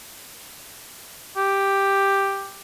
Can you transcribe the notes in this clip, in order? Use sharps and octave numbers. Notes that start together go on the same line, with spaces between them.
G4